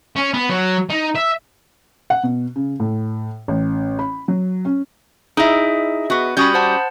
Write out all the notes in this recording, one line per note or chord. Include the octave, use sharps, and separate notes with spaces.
C#4
B3
F#3
D#4
E5
F#5
B2
C#3
A2
A1
B5
F#3
C#4
D#4 E4 G#4 D#5 E5
B3 F#4
G3 C#4 F#4 B5 D#6 G6
C5 F#5 A5